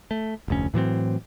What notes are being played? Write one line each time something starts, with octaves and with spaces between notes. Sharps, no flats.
A3
F1 D2 C#4
A2 E3 F#3 C4